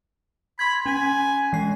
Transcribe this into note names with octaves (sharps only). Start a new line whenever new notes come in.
B5 C6 G#6
C#4 G#5
E3 G#3 C7